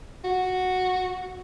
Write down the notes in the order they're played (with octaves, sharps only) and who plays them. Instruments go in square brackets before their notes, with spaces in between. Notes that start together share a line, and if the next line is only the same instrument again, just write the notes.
[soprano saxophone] F#4